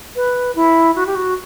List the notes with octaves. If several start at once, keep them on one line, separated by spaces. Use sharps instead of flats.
B4
E4
F#4
G4
F#4